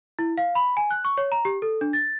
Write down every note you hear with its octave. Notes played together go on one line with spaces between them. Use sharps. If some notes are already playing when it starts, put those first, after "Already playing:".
E4
F5
B5
G#5
F#6
C#6
C#5
A#5
G4
A4
D4
A6